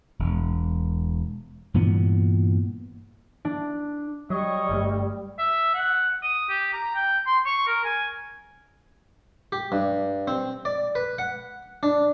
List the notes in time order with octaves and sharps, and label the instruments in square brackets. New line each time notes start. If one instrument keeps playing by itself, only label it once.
[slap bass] E1
G2 A#2 E3 B3
[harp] D4
[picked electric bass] F#3 [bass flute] G3 [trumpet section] C#5 D#5 C#6
[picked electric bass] G1 G2 A3
[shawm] E5
F#5
D#6
G4
A#5
G5
C6
C#6
A#4
G#5
[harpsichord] G4
G2
C4
D5
B4
F#5
D4